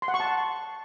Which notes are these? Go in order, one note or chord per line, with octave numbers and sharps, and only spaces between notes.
C6
F#5
C#6
A5